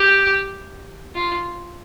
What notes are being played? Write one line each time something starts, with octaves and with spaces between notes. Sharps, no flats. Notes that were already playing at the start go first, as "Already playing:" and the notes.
Already playing: G4
F4